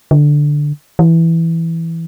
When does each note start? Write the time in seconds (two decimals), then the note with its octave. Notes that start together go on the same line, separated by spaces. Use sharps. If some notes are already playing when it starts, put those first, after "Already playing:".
0.11 D3
0.99 E3